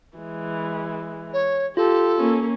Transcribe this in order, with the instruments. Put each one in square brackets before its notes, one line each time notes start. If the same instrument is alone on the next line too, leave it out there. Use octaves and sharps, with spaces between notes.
[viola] E3 G#3
[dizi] C#5
[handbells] F4 [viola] G4 [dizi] A4
[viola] A#3 C#4